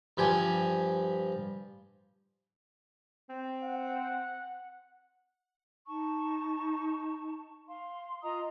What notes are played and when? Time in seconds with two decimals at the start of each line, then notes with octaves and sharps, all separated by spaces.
0.17 G2 F3 G4 G#5
3.29 C4
3.63 F#5
5.87 D#4 A5 C#6
7.67 F5 C6
8.23 F4 D#5 A#5 D#6